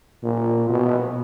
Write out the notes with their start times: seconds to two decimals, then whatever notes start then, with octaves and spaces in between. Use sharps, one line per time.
0.23 A#2
0.70 B2